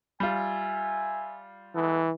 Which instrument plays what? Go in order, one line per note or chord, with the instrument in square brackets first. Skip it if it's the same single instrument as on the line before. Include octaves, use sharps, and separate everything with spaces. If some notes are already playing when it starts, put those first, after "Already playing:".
[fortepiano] G3 F4 [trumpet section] E5 G#5
[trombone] E3 [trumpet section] G#3 B3 A4